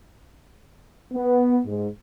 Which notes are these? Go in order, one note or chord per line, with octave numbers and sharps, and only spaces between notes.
B3
G#2